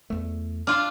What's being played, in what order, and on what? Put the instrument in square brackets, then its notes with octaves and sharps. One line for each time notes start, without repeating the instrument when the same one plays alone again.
[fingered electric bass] E2 A3
[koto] D4 F4 [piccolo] F6